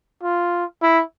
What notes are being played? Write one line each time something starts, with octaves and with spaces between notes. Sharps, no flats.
F4
E4